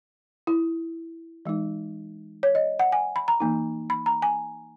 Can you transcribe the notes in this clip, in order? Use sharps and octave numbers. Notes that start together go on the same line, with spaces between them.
E4
E3 G#3 D#4
C#5
D#5
F#5
G#5
B5
A#5
E3 A#3 D#4
B5
A#5
G#5